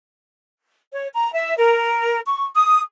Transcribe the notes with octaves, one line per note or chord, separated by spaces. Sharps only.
C#5
A#5
E5
A#4
C#6
D#6